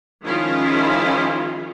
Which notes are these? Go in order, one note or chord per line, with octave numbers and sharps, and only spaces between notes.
D#3 F3 G#3 C#4 E4 F4